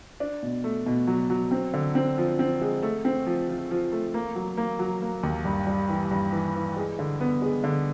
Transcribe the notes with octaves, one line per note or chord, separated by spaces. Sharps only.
D4
B2
A3
B2
F#3
F#3
C4
D3
C4
F3
C4
G#3
A3
C4
F3
F3
F3
A3
A#3
F#3
A#3
F#3
A#3
D#2
G2
G3
E3
G2
E3
E3
G#3
D3
B3
G#3
D3